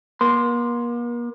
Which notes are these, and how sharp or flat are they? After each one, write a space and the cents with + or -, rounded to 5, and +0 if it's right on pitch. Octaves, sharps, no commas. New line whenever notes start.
A#3 +40 C6 +0